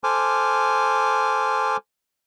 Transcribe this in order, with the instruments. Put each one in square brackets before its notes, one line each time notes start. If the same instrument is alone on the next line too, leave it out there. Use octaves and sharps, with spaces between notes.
[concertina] A4 C5 G#5 D6 F6